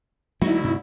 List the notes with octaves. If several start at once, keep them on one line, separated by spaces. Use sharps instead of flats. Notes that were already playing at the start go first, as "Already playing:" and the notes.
D2 F#3 G#3 A#3 D#4 E4 F#4
G2 C3